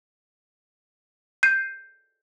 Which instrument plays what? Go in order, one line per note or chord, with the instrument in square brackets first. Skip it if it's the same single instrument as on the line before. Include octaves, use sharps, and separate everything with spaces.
[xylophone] G6 C7 D#7